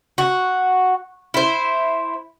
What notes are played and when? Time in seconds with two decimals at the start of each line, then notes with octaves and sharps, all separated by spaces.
0.18 F#4
1.34 E4 C5